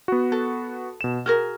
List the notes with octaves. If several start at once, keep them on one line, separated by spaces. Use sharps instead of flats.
B3 F#4
A4
B2 E7
F#4 G#4 A#4 F6